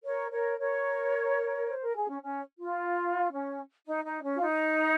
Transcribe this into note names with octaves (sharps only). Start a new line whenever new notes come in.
A#4 C#5
A#4 C#5
A#4 C#5
C5
A#4
G#4
C#4
C#4
F4
C#4
D#4
D#4
C#4
F4
D#4